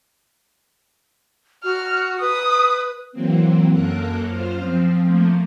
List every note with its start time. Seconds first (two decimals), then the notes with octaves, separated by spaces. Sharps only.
1.64 F#4 F6
2.21 B4 D#6
3.12 E3 F#3 A#3 C4
3.70 F#2 A#3 A4 A#4 F#6
4.26 F#2 F4 C5 F6
4.59 F3 C4
5.02 F3 A3 A#3